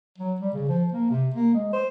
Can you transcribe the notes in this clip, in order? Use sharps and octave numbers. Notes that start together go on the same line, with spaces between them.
F#3
G3
C#3
F3
A#3
C3
A#3
G#3
C5